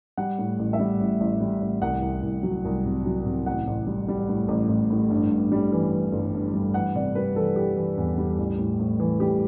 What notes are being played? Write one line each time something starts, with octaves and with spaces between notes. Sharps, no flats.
G3 F#5
A2
A1
E5
G3
A1
A1
G3
A1
C2 F#5
C2
C2
F#3
C2
C3
F#3
C3
A1 F#5
A1
G3
G3
A2
A1
A1
A2
G2
G2
G3
E3
E3
G1
G2
G3
E3 F#5
C3 D5
G3 B4
E3 A4
E3 G4
E3
E2
G3
A1
A2
A2
E3
G3 G4